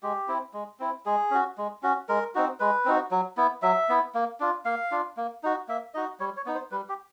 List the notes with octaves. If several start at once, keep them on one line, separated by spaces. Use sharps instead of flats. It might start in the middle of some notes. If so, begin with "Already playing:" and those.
G#3 G4
C4 E4
G#3
C4 E4
G#3 G#4
C#4 F#4
G#3
C#4 F#4
G#3 A#4
C4 D#4 F#4
G#3 B4
C4 D#4 F#4
F#3
B3 E4
F#3 E5
B3 E4
A#3
D4 F4
A#3 F5
D4 F4
A#3
D#4 F#4
A#3 E5
D#4 F#4 D#5
G3 C#5
C#5
B3 D#4
C5
G3 B4
G4